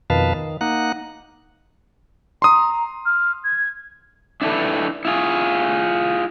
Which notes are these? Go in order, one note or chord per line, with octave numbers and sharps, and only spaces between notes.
F2 B2 D#3 B4 F5 A5
D#3
A#3 D#4 F#5 F#6
A#5 C6 D#6
F6
G#6
D4 E4 A4 B4
E4 F4 G#4